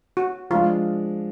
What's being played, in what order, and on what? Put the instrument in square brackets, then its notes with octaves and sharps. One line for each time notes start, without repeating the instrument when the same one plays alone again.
[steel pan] F#4
[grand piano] F3 G#3 D4 [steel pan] F4